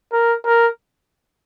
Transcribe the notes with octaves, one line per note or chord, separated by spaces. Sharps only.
A#4
A#4